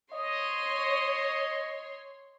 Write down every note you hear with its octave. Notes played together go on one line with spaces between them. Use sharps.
C#5 D#5 C6